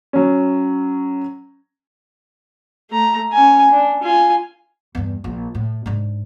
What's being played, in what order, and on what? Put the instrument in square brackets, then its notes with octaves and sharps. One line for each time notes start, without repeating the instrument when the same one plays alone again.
[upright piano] F#3 C#4
[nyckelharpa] A3 A#5
C#4 G#5
D4
F4 G#5
[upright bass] E2 G2
A#1
A2
G#2 D4